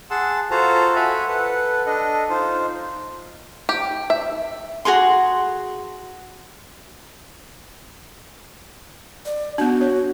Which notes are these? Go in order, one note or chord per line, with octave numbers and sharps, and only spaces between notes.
G#4 F#5 A5 C6 E6
F4 F#4 A4 C5 A5 A#5
E5 F#5 G#5 B5
A4 B4 F#5
D4 A4 D#5
D#4 F4 C5
G4
E5
F#4 G#4 A#5 C6
D5
B3 D4 F#4
C#5